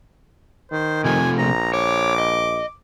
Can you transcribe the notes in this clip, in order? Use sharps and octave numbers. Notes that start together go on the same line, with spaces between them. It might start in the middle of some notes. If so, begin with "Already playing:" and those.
D#3 C5
C3 F3 A3 G#5
A#1 A#5
C#5 D6
D#5